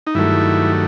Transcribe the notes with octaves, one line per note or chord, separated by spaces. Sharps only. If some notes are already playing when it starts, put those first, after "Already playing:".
D#4
G2 D#3 F#3 A3 E4